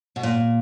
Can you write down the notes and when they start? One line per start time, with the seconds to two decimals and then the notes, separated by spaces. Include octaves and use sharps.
0.16 B2
0.23 A#2